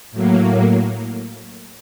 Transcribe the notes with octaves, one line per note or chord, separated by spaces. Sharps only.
A2 F#3 A#3